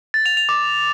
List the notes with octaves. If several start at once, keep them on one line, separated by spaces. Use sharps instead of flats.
A6
F7
F7
D6